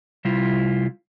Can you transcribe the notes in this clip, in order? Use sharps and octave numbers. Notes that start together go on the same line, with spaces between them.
C3 G3 E4 F4